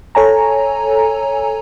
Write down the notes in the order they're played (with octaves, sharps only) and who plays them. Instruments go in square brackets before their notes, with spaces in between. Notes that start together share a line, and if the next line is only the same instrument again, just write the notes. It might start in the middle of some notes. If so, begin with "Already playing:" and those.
[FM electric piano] A4 C#5 G#5 A#5